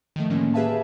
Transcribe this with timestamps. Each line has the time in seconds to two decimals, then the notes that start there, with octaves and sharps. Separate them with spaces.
0.16 D#3 F3 A3
0.29 A2 D3 D#3 G#3 A#3 C#4
0.54 G4 G#4 B4 E5 F5 A5